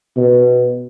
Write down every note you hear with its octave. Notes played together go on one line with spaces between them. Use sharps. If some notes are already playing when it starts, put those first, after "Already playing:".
B2